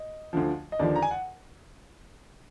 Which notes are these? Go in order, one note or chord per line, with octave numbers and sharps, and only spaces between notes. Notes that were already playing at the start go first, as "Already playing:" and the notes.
Already playing: D#5
D2 D3 F3
D#5
D#2 D3 F3 D5
A#5
G#5
F#5